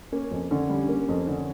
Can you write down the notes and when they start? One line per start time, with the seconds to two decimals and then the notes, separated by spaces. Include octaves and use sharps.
0.12 A#3 C#4
0.31 F2
0.51 D3 C#4
0.69 G3
0.89 A#3
1.08 F2
1.27 D3